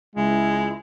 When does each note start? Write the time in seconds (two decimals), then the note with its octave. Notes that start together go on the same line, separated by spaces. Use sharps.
0.16 C#2 G#3 E4